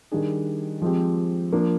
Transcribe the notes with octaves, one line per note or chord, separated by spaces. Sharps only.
D#3 G3 D4 G#4
F3 G#3 C4 G4
F3 A#3 D4